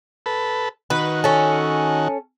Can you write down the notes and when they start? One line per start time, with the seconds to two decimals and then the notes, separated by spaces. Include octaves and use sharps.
0.26 A4 B4
0.90 D#3 F#4 B4
1.24 C#4 A4